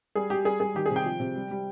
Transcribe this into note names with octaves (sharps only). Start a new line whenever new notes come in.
G3 G#4
G3 G4
G3 G#4
G3 G#4
D#3 G4
G#4
C3
G5
F3
C3
G3
G3